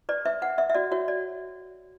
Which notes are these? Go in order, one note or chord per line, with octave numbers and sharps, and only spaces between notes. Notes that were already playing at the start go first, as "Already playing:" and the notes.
B4 D5
B4 E5
B4 F#5
B4 E5
E5
F#4 D5
F#4 C#5
D5